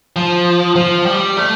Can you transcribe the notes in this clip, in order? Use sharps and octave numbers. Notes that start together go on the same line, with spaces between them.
F3
F3
G3
A3